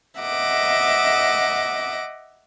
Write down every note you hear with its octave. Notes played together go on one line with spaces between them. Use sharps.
D#5 E5 F#5 D6